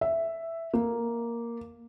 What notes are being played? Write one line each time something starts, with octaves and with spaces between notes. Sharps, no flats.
E5
A#3